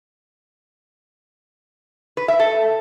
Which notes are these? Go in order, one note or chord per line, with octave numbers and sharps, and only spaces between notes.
B4
E5
A4